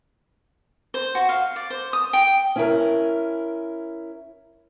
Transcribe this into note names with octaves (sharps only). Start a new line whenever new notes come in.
C5
F#4
F5
D5
C5
D#6
G5
C#4 E4 A#4